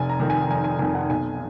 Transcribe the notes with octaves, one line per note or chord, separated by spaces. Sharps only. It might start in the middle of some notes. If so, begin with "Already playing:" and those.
Already playing: F1 G#5
A#5
F2 D#3
G#5
F1 G#5
G#5
F2 D#3 G#5
F#5
B1 G#5